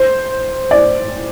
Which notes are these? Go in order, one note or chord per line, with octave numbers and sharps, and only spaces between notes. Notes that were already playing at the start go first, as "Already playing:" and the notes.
Already playing: C5
D5